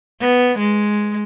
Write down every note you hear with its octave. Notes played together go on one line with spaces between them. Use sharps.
B3
G#3